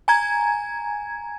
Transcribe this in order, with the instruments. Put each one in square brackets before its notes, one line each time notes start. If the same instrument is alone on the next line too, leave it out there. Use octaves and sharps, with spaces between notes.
[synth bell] G#5 A#5 G#6